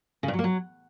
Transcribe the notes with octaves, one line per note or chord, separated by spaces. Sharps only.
C#3
G2
F#3
A#3
F#3